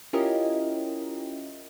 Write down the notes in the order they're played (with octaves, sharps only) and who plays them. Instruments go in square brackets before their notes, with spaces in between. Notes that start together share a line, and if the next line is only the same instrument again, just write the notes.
[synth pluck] C#4 E4 F4 G4 A#4 D#5